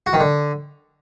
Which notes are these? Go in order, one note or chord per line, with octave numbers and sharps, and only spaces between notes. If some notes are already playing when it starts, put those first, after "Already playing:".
F#4
D#3
D3